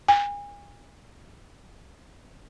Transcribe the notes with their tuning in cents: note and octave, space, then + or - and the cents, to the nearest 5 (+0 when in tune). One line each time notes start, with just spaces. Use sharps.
G#5 -35